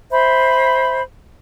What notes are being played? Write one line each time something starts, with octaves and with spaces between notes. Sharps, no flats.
C5 E5 B5